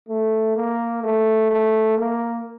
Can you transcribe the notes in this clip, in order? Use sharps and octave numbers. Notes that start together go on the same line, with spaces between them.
A3
A#3
A3
A3
A#3